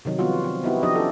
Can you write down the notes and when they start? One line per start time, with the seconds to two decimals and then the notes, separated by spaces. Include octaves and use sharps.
0.05 C3 D#3 F#3 D#4
0.19 F3 G3 B3 F4 F#4
0.44 C4
0.64 B3 D#4 E4 F#4 G4
0.83 F3 B3 D4 D#4 G4 D#5
0.95 C#4 E4 A4